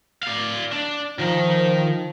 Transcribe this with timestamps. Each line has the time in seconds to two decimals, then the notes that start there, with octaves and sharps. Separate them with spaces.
0.23 D5 F5
0.73 D4
1.19 D#3 F3 A#4